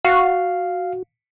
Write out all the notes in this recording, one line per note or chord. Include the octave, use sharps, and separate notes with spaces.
F#4 F5